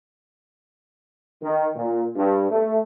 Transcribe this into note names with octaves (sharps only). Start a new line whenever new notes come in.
D#3
A#2
G2
A3